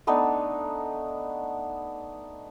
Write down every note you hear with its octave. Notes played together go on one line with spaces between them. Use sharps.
A3 B3 D4 D#4